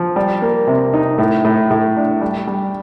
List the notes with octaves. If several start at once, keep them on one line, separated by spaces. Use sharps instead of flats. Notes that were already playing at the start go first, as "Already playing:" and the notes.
Already playing: F3
G3
A#3
C3
D#4
A2
A2
A2
D4
G3
G3